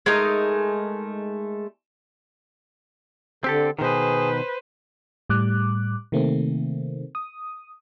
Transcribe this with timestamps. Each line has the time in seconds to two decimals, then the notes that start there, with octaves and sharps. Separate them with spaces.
0.06 G#3 A3 D#4 A#4
3.44 D3 C4 G4 A4
3.79 B2 D#3 G#4 B4 C5
5.30 A2 G3 D6 F#6
6.12 C3 D#3 A3 A#3 C4
7.15 D#6